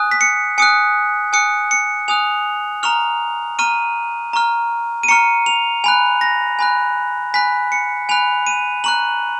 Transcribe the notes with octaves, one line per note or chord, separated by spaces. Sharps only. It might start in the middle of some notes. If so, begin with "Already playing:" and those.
Already playing: G#5 D#6 F#6
B6
C#7
G#5 D#6 F#6 C#7
G#5 D#6 F#6 C#7
C#7
G#5 D#6 F#6 F7
A#5 C#6 F6 F7
A#5 C#6 F6 D#7
A#5 C#6 F6
D#7
A#5 C#6 F6 C#7
F7
G#5 B5 F#6 F7
A#6
G#5 B5 F#6
G#5 B5 F#6 B6
C#7
G#5 B5 F#6 F7
D#7
A#5 C#6 F#6 F#7